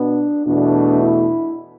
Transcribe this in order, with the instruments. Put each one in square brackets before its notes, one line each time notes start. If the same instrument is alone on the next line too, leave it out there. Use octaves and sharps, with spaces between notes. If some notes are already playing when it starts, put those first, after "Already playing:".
Already playing: [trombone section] B2 B3 D4
E2 B2 A3 D4
E4